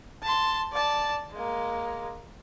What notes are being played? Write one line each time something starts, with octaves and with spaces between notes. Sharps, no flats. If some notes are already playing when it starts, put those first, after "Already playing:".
A5 C6
D5 A5
G#3 A#3